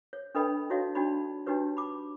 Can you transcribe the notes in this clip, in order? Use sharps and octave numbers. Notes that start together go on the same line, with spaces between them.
C#5
D4 A4 B4 D#5 G5 B5
D#4 E4 F#4 C#5 D#5 F5
D4 D#4 F#4 D5 B5
D4 D#4 F#4 G4 B4 C#5
B5 D6